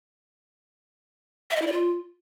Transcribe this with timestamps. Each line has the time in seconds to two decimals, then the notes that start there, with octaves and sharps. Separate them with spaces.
1.51 E5
1.56 D#5
1.62 E4
1.67 D5
1.72 F4